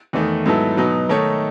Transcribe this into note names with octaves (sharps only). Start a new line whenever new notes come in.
E2 D#3 A3
G#2 F#3 B3 E4 A4
B2 F#3 B3 D#4
D#3 A3 D#4 A4 C#5